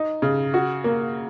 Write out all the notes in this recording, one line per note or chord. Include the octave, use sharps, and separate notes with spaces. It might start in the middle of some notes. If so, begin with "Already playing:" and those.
Already playing: D#4
C#3
F#4
A#3